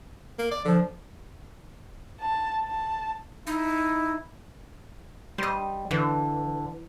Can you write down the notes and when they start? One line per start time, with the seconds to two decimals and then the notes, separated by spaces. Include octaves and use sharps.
0.39 A#3
0.52 D5
0.65 D3 F3
2.21 A5
2.64 A5
3.47 D#4 E4
5.38 G3 C5 D#5
5.91 D3 E3